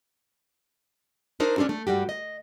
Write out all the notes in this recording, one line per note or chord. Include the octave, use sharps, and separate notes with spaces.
D4 D#4 A#4 C5
C#4 D4 F4 F#4 A4
A3
G2 G3 F#4 G4
D#5